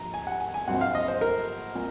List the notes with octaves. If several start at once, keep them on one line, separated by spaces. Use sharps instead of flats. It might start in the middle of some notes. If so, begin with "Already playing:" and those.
Already playing: A#1 G#2 F3 A#5
G#5
F#5
G#5
G#5
A#1 G#2 F#3 C4 F#5
F5
D#5
C5
A#4
A#2